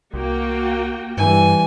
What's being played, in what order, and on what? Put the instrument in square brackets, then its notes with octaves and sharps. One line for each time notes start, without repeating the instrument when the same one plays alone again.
[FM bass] C2 [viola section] A#3 F#4 G5
[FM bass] G2 [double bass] E3 G3 [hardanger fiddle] G#5